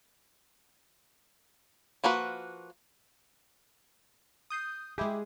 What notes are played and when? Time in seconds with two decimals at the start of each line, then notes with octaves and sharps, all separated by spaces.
2.04 F3 A#3 F#4 B4
4.50 D#6 G6 C7
4.98 G#3 E4 G4 G#4